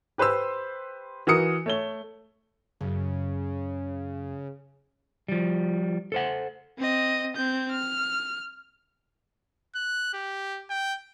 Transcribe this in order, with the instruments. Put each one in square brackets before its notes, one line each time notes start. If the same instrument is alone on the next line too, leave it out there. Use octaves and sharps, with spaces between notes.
[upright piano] G4 B4 C5 C6 E6
E3 F#4 A#4 D#6 C#7
A3 C#5 G7
[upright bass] F#2 [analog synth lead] C#3
[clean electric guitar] F3 G3
A4 C5 F#5
[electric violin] C4 D#5
C4 G6
F6
[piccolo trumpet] F#6
G4
G5